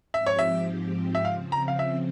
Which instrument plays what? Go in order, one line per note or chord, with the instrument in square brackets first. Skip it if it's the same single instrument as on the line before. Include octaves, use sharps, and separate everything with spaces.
[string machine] G#2 F3 C4 G4 [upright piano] E5
[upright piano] C#5
E5
E5
[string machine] C#3 F3 C4 [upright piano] F5
[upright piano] A#5
F5
E5